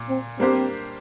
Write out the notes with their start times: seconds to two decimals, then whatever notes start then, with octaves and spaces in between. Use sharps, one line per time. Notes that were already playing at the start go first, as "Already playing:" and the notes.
Already playing: A#2
0.09 C4
0.39 G3 A#3 C4 D4 G4 C5